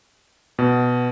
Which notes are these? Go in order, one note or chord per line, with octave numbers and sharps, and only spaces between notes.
B2